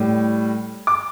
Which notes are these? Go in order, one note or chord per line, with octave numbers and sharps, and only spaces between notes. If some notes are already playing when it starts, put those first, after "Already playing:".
Already playing: A2 G3
D6